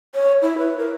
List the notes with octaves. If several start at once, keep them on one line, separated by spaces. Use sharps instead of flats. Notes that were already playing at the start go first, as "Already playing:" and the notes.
C#5
E4
B4
A#4